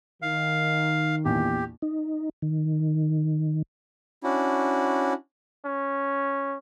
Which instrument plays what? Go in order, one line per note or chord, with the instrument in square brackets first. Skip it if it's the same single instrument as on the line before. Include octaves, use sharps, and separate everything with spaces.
[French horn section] D#3 [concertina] F5
[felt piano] A#1 E2 [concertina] G4
[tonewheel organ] D#4
D#3
[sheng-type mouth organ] C#4 D4 E4 F#4
[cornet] C#4